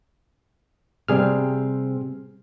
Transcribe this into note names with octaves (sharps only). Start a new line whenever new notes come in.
C3 G3 C4 G#4 F6